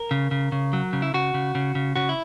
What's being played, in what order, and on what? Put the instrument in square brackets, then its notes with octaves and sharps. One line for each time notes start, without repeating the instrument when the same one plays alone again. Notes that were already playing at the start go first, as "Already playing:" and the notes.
Already playing: [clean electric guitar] A#4
C#3
C#3
C#3
F#3
C#3
E4
C#3 F#4
C#3
C#3
C#3
C#3 F#4
E4